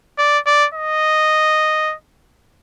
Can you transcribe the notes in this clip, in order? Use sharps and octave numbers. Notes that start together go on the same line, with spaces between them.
D5
D5
D#5